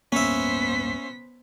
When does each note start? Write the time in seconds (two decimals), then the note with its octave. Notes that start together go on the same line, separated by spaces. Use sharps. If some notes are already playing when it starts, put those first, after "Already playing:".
0.12 D1 G2 A#3 B3 C#4 C5 E5 B6